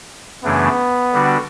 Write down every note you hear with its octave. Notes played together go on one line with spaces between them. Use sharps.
F#2 C#3 E3 A3 B3 D4
D3 G3 D4 F#4